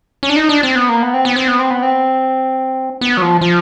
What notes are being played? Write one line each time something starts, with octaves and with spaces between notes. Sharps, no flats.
C#4
D4
D#4
D4
C4
B3
A#3
B3
C4
B3
C4
B3
C4
B3
C4
B3
F#3
F3
F3